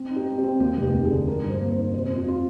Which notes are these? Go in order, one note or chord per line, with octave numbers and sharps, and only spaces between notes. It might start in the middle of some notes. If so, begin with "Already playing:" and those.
Already playing: C4
D#4
G4
C4
G4
C4
D#2 G4
F1
G4
D#2
G#4
D3
D#4 A#4
G2
C5
A#3
C5
D#4
C3 C5
F2
F4
F4